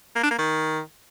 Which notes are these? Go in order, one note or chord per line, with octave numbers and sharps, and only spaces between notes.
A#3
D4
A#3
D#3